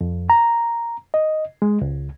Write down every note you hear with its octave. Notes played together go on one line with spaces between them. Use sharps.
F2
A#5
D#5
G#3
C#2